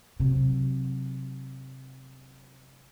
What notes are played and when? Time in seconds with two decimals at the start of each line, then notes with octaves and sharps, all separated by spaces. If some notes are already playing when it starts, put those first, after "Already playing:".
0.20 C3 F#3